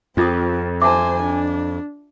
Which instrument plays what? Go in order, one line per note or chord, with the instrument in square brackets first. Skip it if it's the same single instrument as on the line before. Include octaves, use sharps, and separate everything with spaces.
[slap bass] F2 [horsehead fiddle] C4 [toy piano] F4 G#4 D#6
[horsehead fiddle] C5 G#5 [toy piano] E5 A5 [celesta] D6
[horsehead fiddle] D4